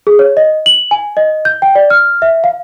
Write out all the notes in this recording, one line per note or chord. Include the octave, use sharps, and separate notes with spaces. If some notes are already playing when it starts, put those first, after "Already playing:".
G#4
C#5
D#5
F#7
G#5
D#5
G6
G5
D5
F6
E5
F5